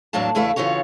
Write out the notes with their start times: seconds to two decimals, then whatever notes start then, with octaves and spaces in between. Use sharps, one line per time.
0.13 E2 A2 F#3 D4 F5 A5
0.35 E2 C#3 A3 E4 B4 F5
0.56 C#3 E3 F4 F#4 C#5